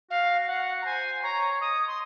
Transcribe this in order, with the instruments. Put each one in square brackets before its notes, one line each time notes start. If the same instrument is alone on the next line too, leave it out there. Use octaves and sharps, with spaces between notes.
[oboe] F#4 [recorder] F5
[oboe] F#4 [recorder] F#5
[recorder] A#5
[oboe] C5 [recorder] G#5
[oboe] C#5 [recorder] A#5
[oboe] D#5 [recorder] D#6
[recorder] C6